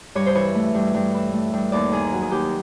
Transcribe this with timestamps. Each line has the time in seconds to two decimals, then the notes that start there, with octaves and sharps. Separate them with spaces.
0.15 G2 C#5
0.26 C5
0.35 E3 C#5
0.55 A3
0.74 G2
0.94 G2
1.14 E3
1.33 A3
1.53 G2
1.72 D#2 D5
1.92 D#3 G#4
2.12 F#3
2.22 G#4
2.31 D#2 G4